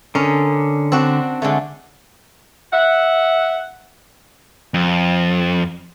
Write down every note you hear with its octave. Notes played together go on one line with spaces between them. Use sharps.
D3 C#4 A#4 D#5
C4 D4 F#4
D3 G#3 A3
E5 F#5
F2